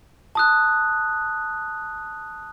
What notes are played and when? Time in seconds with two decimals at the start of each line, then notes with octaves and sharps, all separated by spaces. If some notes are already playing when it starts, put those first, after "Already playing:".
0.35 A5 D#6 F#6